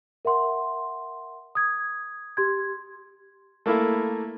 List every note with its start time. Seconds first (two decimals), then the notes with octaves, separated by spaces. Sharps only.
0.25 A#4 E5 F#5 C6
1.55 D#6 G#6
2.37 G4 C6 G#6
3.66 A3 A#3 E4 E5